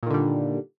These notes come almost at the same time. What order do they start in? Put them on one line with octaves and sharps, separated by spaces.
A#2 D#3 D3 G3